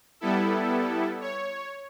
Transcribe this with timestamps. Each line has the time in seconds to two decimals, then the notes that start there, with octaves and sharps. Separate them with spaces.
0.20 G3 B3 E4 A4
1.21 C#5